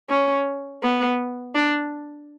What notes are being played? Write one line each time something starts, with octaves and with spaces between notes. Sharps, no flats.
C#4
B3
D4